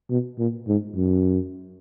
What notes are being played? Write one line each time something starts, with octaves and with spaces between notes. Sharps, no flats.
B2
A#2
G#2
F#2